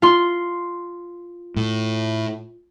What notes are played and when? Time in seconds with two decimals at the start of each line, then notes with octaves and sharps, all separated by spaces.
0.02 F4 C6
1.56 A2